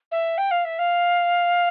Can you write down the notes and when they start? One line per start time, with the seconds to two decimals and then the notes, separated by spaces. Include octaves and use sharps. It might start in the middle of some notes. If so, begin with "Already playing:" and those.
0.11 E5
0.37 G5
0.51 F5
0.64 E5
0.78 F5